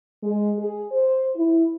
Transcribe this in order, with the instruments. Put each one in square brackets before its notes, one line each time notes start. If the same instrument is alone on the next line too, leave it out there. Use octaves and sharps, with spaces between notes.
[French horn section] G#3
G#4
C5
E4